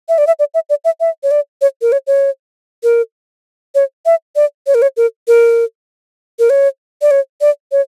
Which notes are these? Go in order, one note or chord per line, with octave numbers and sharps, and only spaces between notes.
E5
D5
E5
D5
E5
D5
E5
E5
C#5
D5
C#5
A#4
C#5
C#5
A#4
C#5
E5
D5
C#5
A#4
C#5
A#4
A#4
A#4
C#5
D5
C#5
D5
C#5